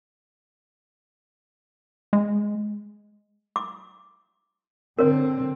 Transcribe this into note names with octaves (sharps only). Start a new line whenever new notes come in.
G#3
D6
D3 C4 A#4 C#5